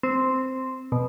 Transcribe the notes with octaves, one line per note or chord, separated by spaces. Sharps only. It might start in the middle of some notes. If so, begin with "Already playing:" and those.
C4
B2